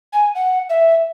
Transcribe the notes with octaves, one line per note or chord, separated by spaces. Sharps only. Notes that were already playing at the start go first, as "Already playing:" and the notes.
G#5
F#5
E5